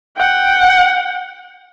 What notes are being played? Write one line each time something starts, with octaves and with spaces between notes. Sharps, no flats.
F#5 G5